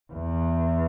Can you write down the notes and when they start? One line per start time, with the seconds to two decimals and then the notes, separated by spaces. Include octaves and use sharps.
0.13 E2